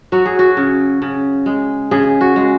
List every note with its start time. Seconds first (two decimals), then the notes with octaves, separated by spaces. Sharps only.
0.12 F#3 F#4
0.26 G#4
0.39 F#4
0.57 C#3
1.02 C#3
1.46 G#3
1.91 C#3 G#4
2.21 F#4
2.36 G#3